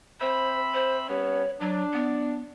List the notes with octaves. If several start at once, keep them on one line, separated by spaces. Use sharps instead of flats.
C4 C5 E5 B5
C5
G3 B3 C#4 C#5
F#3 D4
B3